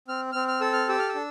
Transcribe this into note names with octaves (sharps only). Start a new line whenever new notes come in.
C4 F6
C4 F6
F6
A4 E6
F6
G4 E6
F6
E6
D4